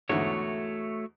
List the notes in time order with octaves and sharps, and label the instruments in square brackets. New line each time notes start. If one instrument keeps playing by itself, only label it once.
[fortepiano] E2 G#2 D3 [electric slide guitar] A3 F#4 C#5